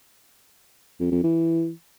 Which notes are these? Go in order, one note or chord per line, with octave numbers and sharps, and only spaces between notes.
F2
F2
E3